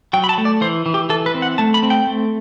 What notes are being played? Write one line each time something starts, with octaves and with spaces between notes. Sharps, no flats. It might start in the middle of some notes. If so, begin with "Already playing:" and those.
F#3 G5
B5
A5
A3
D5
E3 C5
E3
G4
E3 A4
B4
C4
F#5
A3 A5
B5
C4
G5
A3